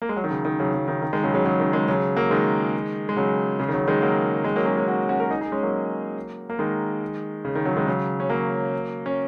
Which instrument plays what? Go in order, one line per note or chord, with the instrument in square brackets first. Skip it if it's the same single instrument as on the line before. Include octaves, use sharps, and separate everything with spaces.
[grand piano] A#3
G#3
F#3
D#3
C#3
D#3
C#3 F#3
C#3 F#3
D#3
D#3
D#3 G#3
C#3 F#3
C#3 F#3
C#3 F#3
D#3
D#3 G#3
C#3 F#3
F#3 A#3
D#3 G#3
G#3
C#3 F#3
C#3
D#3
C#3 F#3
D#3 G#3
F#3 A#3
D#3 G#3
F#3 A#3
G#3 C#4
G#3 C#4
C#4 F#4
C#4 F#4
F#4 A#4
D#4 G#4
D#4 G#4
G#3 C#4
F#3 A#3
A#3
D#3 G#3
C#3
D#3
C#3 F#3
D#3 G#3
C#3 F#3
C#4
F#3 A#3
C#4